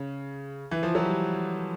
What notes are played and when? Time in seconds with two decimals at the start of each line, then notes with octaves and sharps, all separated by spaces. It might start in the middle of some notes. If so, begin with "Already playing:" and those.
Already playing: C#3
0.71 E3
0.83 F3
0.95 F#3
1.05 G3